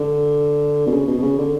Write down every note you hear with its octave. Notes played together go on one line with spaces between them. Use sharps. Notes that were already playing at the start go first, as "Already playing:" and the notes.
Already playing: D3
B2
C#3
B2
B2
C#3
D3